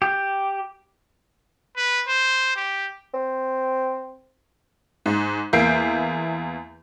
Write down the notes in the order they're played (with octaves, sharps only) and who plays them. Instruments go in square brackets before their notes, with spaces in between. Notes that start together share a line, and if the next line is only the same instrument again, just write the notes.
[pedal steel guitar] G4
[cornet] B4
C5
G4
[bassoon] C4
[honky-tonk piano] G#2
E2 A#3 E5 G6 C7 D7